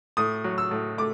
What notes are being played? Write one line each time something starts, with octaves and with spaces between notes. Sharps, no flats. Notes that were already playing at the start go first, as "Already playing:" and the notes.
A2 D#6
F#3
E6
A2
A3 D6